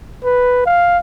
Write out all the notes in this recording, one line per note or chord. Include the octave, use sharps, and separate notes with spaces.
B4
F5